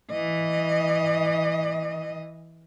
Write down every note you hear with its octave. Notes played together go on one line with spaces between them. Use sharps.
E3 D#5